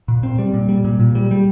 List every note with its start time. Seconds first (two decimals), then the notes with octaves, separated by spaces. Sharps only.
0.08 A#2
0.23 C4
0.39 G3
0.54 A#2
0.69 G3
0.85 A#2
1.00 A#2
1.15 G3
1.31 G3